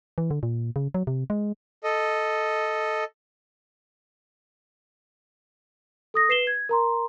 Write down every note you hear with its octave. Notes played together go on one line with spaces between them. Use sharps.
E3
D3
A#2
C#3
F#3
C3
G#3
A4 D#5
A4 D#6 A#6
B4 C7 E7 G7
G#6
A#4 A#5 C6